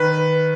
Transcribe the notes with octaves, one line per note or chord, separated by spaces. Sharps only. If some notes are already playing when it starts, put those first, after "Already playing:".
Already playing: D#3 B4